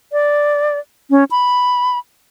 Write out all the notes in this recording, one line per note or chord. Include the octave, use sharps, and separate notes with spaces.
D5
C#4
B5